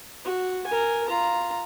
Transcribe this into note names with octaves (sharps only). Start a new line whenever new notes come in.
F#4
A#4 G#5
F4 A#5